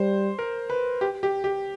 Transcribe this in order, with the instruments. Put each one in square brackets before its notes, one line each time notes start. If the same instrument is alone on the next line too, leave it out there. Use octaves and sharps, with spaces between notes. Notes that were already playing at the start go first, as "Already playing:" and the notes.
Already playing: [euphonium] G3 [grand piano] C5
[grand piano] A#4
B4
G4
G4
G4